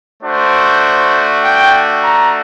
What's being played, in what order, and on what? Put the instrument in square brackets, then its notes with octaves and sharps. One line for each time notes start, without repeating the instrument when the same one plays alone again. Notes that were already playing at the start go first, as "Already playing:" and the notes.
[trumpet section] A3 D4 F#4 C5
G5
A#5